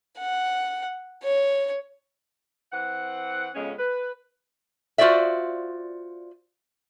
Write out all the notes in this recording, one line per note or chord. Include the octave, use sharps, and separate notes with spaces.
F#5
C#5
E3 C4 F#5
F2 C#3 G#3 B3 C#4
B4
F4 F#4 C5 D5 E5